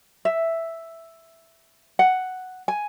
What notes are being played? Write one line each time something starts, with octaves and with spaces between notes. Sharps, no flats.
E5
F#5
G#5